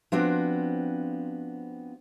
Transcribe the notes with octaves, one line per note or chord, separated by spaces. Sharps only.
F3 B3 C4 D4 F#4